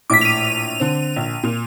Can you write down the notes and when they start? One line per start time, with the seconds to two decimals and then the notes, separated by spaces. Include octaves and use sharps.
0.10 A#1 A2 D6 B6
0.21 D#7 F7
0.80 D3 C4
1.16 A#1
1.44 A#2